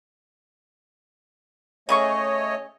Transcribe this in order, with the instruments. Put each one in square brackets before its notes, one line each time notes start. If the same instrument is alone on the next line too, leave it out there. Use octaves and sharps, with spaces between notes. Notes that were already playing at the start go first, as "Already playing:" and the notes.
[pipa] C#3 G#4 C#6 [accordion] A3 C#5 D#5